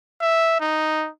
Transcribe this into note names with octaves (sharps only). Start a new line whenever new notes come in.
E5
D#4